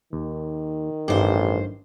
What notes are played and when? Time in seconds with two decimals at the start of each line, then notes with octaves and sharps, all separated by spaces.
0.13 D#2 D#3
1.08 A1 G2 D#4 G4 C5